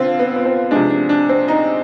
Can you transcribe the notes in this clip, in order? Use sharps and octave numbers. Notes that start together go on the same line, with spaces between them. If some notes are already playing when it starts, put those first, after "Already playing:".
Already playing: D3 C4 F4
B3
B3
C4
C3 F3 G#3 D4
D4
D4
C4
D#4